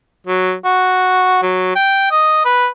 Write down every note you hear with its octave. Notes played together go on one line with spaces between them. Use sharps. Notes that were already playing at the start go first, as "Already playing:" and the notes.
F#3
F#4
F#3
G5
D#5
B4